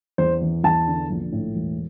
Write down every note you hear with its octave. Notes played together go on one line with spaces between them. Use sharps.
E2 C5
E3
E2 A5
D3
A#1
A2
E1